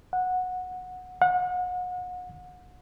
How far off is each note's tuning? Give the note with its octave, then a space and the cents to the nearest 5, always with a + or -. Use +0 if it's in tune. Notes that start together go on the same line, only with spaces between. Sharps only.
F#5 -15
F#5 -35